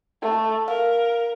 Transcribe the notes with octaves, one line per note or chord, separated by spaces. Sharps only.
A3
A#4 F5